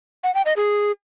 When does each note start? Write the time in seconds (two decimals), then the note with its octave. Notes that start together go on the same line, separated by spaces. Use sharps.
0.24 F#5
0.35 G5
0.46 D#5
0.57 G#4